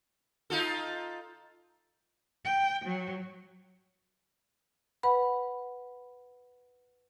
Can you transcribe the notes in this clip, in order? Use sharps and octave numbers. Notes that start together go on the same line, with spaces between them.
D#4 F4 A4
G5
F#3
B4 F#5 B5